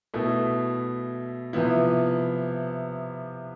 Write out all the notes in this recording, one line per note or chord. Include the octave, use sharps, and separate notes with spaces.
B2 A3 E4
C3 F3 B3 E4